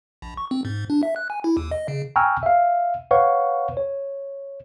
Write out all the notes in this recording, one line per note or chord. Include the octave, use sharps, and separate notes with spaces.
A#1
C#6
C4
G#2
D4
E5
F#6
G#5
E4
D#2
D#5
C#3
G5 G#5 A#5 C#6 E6 F6
E5 F5
B4 C#5 F5 F#5 C#6
C#5